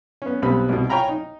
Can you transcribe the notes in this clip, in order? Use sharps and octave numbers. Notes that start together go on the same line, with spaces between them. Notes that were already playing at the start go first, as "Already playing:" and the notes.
B3 C#4
B1 G3 B3 C4 B4 B5
C2 B2
F4 C#5 G5 G#5 A#5 B5
D#4